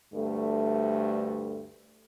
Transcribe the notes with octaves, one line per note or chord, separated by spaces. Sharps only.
D2 G2 A3